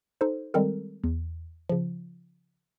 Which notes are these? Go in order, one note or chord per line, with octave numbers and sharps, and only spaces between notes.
D#4 A4 C5
D#3 G3 G#3 C4 A4 A#4
E2
C#3 F3